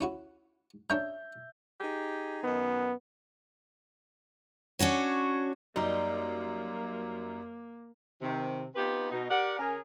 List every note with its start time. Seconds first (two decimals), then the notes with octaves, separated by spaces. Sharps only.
0.01 C#4 E4 F#4
0.90 D4 C#5 E5 A#5 G6
1.79 D#4 G4 G#4
2.44 F#2 D#3 B3 D#5
4.79 C#4 D4 F#4 C#5
5.76 F#2 G3 A#3 D#4
8.22 C3 D#3
8.75 B3 C4 D#4 F4 G4 B4
9.12 B2 D#4
9.30 G4 A#4 D5 F#5
9.59 C#3 C#4 G#4 A#4